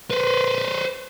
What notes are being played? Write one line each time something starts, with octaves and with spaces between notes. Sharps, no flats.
B4 C5